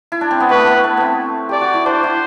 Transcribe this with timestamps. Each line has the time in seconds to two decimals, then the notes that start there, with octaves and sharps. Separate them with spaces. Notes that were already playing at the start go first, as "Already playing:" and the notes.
0.12 E4
0.21 D4
0.31 C4
0.40 B3
0.50 A3 B4
0.67 B3
0.84 A3
0.97 B3 C4
1.49 G4 D5
1.61 F#4
1.74 E4
1.86 D4 C5
2.04 E4